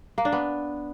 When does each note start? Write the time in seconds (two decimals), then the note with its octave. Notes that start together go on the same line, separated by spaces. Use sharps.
0.18 A#3
0.25 D4
0.32 B3